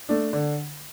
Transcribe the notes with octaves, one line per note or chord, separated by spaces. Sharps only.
A3 D4
D3